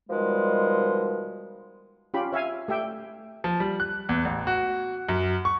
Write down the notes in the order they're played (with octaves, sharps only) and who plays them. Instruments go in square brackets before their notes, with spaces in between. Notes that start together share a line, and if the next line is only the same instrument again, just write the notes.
[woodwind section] B2 D#3 F3 G3 G#3
[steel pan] C#4 F4 G4 B5
C#5 E5 F5 G#5
A3 G4 E5 G5
[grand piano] F3
G3
F#6
E2
A1
F#4
F#2
C#6